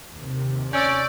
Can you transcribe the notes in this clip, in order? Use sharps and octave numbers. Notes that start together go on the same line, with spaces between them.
D#2 C3
C#4 D5 C#6 E6 G6